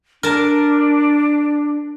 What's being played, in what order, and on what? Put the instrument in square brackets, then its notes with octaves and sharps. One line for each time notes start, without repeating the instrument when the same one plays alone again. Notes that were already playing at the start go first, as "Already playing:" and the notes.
[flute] D4 [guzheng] A#4 A5